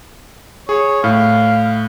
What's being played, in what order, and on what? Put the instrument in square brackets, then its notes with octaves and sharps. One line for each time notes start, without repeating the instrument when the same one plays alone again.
[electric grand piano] G#4 [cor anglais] C#5
[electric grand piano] A2 [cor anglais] F5